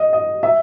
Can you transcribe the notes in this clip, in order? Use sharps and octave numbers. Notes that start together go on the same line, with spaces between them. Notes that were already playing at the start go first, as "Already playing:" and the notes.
Already playing: D#5
D#5
E5